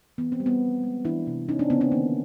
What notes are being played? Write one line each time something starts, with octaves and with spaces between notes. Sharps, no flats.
E3 B3
C4
G3
B3
F3
G#3
E3 D4 E4
C3
A#3 C#4 D#4
C4 D4
C#3 B3 C#4
C4 D4
D#3 A#3